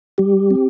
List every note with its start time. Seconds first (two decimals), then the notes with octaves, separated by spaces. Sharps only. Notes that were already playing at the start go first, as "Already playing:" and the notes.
0.18 G3 G4
0.51 C4